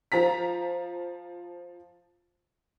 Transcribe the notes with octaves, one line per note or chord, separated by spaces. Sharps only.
F3 A#5 B6